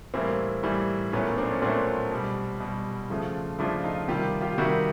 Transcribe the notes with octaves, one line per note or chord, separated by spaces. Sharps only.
A2 E3 G3 A#3 C4
A2 E3 G3
A#2 F#3 A3 B3 C#4
C4 D4
C#4
A#2 F#3 A3 C4 D4
B2 G3
B2 G3
C#3 F3 A3
C#3 F3 A3 D4 E4
D#4 F4
C3 D#3 G3 F4 G4
F4 G4
C3 D#3 G3 E4 F#4